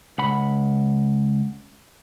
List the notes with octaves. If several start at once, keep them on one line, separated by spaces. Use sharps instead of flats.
C#2 F#5 B5